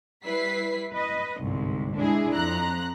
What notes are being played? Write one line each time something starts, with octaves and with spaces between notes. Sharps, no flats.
G3 E4 B4 B6 C7
B4 D#5
G1 C2 G#2
G#3 D4 E4 G#4
F2 A#5 F#6